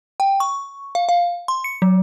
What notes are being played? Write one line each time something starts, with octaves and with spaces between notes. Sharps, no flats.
G5
C#6
F5
F5
C6
C#7
F#3